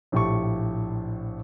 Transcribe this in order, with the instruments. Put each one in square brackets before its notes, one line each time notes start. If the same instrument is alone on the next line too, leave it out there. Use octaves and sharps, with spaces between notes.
[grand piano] A#1 A2 G4 A5 C#6